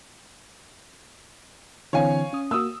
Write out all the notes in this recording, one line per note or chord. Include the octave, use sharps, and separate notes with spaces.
D3 E3 C4 C#5 F5 G#5
C#4 D#6
A#3 F#4 D#6 E6